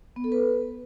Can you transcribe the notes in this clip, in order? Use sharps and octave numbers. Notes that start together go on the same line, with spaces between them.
B3
A4
B4